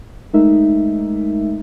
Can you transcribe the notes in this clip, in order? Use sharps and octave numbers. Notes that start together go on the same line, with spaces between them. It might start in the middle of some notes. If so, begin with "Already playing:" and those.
G#3 A3 D#4 A#4 E5